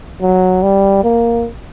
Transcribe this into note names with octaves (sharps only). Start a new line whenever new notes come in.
F#3
G3
A#3